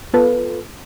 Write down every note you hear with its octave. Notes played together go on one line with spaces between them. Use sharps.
B3 F4 A4 B4